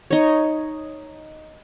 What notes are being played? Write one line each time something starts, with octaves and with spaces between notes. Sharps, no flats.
D#4 C#5